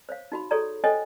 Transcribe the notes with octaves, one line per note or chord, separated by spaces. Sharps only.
C5 C#5 F5
D#4 F#4 B5
F#4 G#4 A4 C#5 D5 A#5
A4 C5 C#5 D#5 G5 G#5